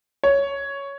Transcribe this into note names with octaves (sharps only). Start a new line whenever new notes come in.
C#5